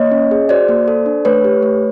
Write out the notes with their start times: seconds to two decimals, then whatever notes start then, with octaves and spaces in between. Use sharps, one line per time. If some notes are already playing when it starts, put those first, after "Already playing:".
Already playing: A#3 C#5 D#5
0.12 C#4
0.31 G#4
0.49 F#4 C5 D5
0.69 A#3
0.88 A4
1.06 D4
1.25 A3 B4 C#5
1.44 G4
1.63 A3